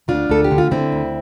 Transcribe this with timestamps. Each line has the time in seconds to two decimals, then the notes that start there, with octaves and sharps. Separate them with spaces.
0.08 D2 D4 F4
0.29 D2 A4
0.44 G4
0.51 D3
0.58 F4
0.71 D3 C4 E4
0.92 D2